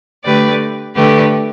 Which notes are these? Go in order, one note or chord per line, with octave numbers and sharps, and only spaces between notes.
D3 A3 G4 B4 D5
D3 A3 G4 B4